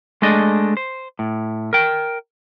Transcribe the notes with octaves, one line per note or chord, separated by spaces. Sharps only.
G#3 A3 D4 D#5
C5
A2
A#4 G5